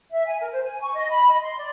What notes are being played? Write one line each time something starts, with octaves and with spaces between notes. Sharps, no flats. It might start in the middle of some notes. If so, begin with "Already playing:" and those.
E5
G#5
A#4
C5
G#5
C#6
D#5
B5
D#5
C6
D5